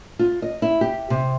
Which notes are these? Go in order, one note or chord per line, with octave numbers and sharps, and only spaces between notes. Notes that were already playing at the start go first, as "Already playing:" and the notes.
F4
D#5
E4
G4
C3